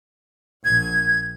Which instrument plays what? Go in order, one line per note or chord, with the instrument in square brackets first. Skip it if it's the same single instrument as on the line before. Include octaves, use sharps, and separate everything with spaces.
[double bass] A#1 [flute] G#6